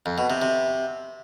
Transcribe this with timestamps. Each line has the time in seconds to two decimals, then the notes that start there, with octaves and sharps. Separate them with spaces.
0.06 F2
0.18 B2
0.30 C3
0.42 C3